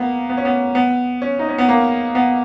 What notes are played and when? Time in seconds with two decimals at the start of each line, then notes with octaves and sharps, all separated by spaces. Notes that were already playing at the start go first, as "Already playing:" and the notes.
Already playing: A#3 B3
0.30 B3
0.37 C#4
0.45 B3
0.75 B3
1.22 C#4
1.39 D#4
1.49 C#4
1.58 B3
1.69 A#3
2.15 B3